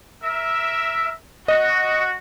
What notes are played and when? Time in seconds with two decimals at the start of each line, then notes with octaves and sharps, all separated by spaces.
0.23 A#4 E5
1.48 F#4 D#5